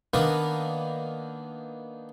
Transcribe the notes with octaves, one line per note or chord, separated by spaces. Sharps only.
D#3 A#3 B3 D4 A#4 B4